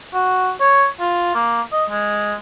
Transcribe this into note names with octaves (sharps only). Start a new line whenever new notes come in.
F#4
C#5
F4
A#3
D#5
G#3